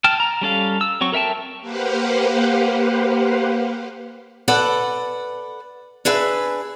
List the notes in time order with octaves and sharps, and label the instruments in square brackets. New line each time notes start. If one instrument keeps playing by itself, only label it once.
[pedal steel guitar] G5 A5 F6
A#5
G3 C#4 A4 F5
E6
F#3 C4 C#6
A4 A#4 E5 G5 A5
[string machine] A#3 G4 B4 C5 F5 F#5
[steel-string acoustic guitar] A4 B4 D5 F#5
D4 G#4 B4 E5